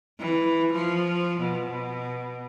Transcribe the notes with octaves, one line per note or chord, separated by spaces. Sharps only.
E3
F3
B2